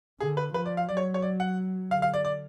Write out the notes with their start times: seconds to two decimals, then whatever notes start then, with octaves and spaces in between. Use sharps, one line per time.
0.20 D3 G#4
0.37 B4
0.54 F3 B4
0.66 D5
0.77 F5
0.89 F#3 D5
0.97 C#5
1.14 C#5
1.22 D5
1.40 F#5
1.91 D3 F5
2.02 F5
2.14 D5
2.25 D5